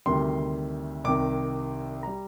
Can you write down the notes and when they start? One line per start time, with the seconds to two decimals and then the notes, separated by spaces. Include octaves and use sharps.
0.06 D2 C3 D#3 G3 C6
1.04 C2 C3 D#3 D6
2.03 G3 A#5